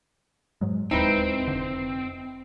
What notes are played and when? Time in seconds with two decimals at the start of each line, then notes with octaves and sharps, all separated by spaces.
0.61 G#2 F#3 G#3
0.91 D1 D#2 G#3 C4 D#4 E4 B4
1.47 F1 A#1 D3